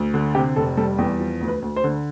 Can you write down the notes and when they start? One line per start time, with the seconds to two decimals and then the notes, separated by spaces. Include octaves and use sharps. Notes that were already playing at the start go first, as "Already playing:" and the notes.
Already playing: D2
0.14 D3
0.35 C3 G4
0.56 F1 A4
0.77 G3 A4
0.98 E2 G4
1.20 F3
1.41 D2
1.48 B4
1.62 D2
1.76 C5
1.84 D3